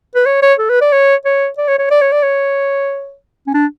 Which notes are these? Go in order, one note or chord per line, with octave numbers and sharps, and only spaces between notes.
B4
C#5
C#5
A4
B4
D5
C#5
C#5
D5
C#5
C#5
D5
C#5
D5
C#5
C#4
D4